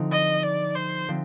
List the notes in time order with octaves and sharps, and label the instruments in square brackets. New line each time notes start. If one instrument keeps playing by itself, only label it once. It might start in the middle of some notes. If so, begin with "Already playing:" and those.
Already playing: [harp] D3 F3 C4 D#4
[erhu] D#5
D5
C5
[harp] D3 F3 C4